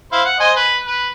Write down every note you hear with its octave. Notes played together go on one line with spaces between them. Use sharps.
E4 C5 F5
F#5
C5 D#5 G#5
B4
B4